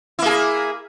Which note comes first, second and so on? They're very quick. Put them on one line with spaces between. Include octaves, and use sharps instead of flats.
E4 A#3 G#4